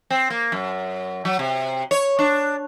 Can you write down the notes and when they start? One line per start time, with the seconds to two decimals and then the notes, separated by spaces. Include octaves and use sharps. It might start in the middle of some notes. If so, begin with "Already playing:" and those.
0.10 C4
0.30 A#3
0.52 F#2
1.25 F#3
1.39 C3
1.91 C#5
2.19 D4